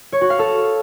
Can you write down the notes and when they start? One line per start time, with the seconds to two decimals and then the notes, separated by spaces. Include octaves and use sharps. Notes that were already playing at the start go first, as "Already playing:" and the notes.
0.12 C#5
0.21 F#4
0.30 F5
0.39 A4